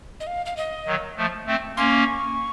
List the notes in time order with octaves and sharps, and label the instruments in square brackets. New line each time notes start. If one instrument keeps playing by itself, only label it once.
[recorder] D#5
F5
F5
D#5
[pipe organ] D#3 F#3
F3 A3
A3 C4
[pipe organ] A#3 C#4 [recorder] C6
[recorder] C#6